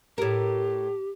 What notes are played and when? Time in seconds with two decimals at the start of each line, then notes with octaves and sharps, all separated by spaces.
0.18 A2 G4 A#4